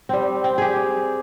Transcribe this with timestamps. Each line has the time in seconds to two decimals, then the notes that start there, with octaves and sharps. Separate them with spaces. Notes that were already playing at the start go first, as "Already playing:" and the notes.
0.09 G3 C4
0.44 C4
0.58 G4 G#4
0.76 C5